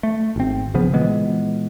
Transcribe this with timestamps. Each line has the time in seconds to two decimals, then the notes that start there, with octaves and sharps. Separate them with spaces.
0.03 A3
0.36 G#1 C4
0.74 A#1 C#3 F3 B3
0.93 A#2 E3 G#3 B3